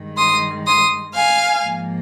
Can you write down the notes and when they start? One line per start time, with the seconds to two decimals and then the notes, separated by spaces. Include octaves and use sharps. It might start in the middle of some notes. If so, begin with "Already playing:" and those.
Already playing: G2 D#3 G#3
0.17 C6 D#6
0.66 C6 D#6
1.14 F5 G#5
1.63 G#2 F3 A#3